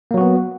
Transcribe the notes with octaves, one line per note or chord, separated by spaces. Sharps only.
F#3 A#3 B3 F#4